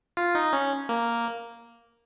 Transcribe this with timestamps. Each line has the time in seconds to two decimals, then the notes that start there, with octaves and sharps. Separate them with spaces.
0.17 F4
0.35 D#4
0.53 C#4
0.89 A#3